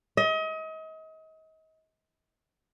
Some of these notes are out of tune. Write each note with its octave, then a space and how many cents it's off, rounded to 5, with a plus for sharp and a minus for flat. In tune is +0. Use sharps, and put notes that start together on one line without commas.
D#5 +35